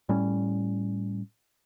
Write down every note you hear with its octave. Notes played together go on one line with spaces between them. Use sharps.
A2 G3 C#4